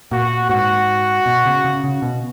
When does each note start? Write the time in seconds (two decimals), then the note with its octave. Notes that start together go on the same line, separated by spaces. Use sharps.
0.11 A#2 F#4
0.49 G#2 F#4
1.26 B2
1.46 C#3
1.64 C#3
1.84 C#3
2.02 B2